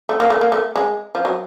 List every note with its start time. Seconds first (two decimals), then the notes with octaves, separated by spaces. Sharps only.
0.09 A3
0.20 A#3
0.30 A3
0.41 A#3
0.52 A3
0.76 G#3
1.15 F3
1.25 F#3